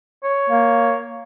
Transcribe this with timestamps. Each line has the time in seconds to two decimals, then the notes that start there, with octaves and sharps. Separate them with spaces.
0.24 C#5
0.50 A#3